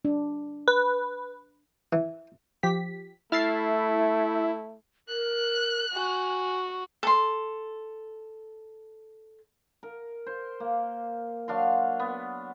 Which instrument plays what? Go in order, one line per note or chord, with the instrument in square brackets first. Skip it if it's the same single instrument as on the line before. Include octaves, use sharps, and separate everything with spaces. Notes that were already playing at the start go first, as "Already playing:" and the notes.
[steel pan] D4
[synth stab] B4
[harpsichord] E3
[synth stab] F3 G4 B6
[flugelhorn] A3 [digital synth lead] E4 [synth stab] F6 A6 C7
[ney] A#4 [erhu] F#6
[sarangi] F#4 [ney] G#5
[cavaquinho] A4 C6
[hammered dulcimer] A#4
C5
A#3
F#3 D4 F5 C6
B3